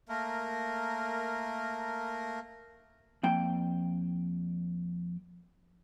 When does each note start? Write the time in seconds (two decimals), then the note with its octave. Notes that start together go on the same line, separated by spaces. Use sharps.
0.09 A3 A#3 A#4
3.23 F2 A#3 G5